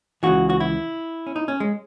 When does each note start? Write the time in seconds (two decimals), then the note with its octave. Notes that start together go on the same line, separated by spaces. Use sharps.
0.23 C#2 C#3 E3 F#4
0.50 F#4
0.60 E4
1.27 C#4
1.36 D#4
1.48 C#4
1.60 G#3